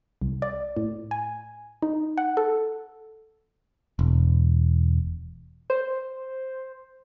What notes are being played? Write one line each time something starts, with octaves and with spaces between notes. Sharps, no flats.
C2
D5
A2
G#5
D#4
F#5
A4
E1
C5